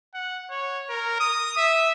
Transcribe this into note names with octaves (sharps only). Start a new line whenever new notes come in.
F#5
C#5
A#4
D#6
E5